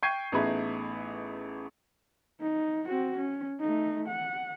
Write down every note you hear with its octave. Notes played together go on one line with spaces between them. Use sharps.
G5 C#6 G6 G#6 C7 D#7
A1 A3 B3 D#4 G#4 B5
D#4
C4 F#4
C#4
A3 D#4
F#5